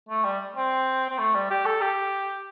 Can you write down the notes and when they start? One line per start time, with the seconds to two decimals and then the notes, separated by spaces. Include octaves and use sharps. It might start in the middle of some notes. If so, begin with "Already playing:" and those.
0.09 A3
0.25 G3
0.57 C4
1.10 C4
1.19 A3
1.35 G3
1.50 G4
1.66 A4
1.81 G4